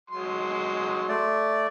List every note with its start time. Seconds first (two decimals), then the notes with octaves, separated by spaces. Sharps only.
0.10 F#3 G#3 C6
1.08 A3 D5